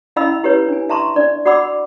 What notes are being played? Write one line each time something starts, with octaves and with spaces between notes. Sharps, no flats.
C#4 E4 D#5 F5 B5 E6
E4 G4 B4 C#5
D4 G#5
E5 A5 A#5 C6 C#6
D4 D5
F#4 D5 F#5 B5 D6 E6